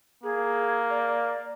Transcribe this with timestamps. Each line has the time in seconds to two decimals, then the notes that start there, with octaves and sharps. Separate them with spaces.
0.24 A#3 G#4
0.90 D5